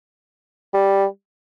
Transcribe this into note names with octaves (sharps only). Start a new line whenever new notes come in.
G3